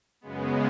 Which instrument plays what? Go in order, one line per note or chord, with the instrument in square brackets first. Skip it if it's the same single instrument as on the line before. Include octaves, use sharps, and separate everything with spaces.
[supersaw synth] F#2 C#3 G#3 B3